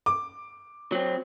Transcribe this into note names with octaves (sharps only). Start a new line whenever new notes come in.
D6
F#3 C4